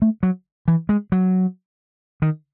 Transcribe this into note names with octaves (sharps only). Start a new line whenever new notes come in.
A3
F#3
E3
G#3
F#3
D#3